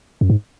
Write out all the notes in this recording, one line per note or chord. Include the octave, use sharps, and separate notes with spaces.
F#2
G#2